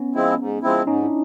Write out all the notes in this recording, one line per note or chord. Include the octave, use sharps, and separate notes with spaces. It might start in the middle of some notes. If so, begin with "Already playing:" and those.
Already playing: B3 C#4
F3 G#3 C4 E4
G#2
F3 G#3 C4 E4
G#2 C#4 D#4
D4 E4